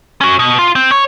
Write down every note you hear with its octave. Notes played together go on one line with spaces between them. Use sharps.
C#4 F#4
B2
F4
C4
C#5